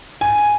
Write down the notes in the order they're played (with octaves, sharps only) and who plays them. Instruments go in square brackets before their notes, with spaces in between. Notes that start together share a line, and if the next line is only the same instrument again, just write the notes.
[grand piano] G#5